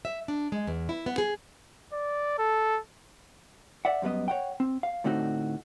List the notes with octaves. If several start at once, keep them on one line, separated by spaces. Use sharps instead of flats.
E5
D4
G#3
E2
E4
B3
G#4
D5
A4
D5 E5 F#5
F#2 G3 B3 D#5
C#5 F#5 G5
C4
F5
A2 D3 A3 C4 D#4 F#4